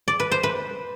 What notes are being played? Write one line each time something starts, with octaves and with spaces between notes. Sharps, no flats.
D5
B4
C5
B4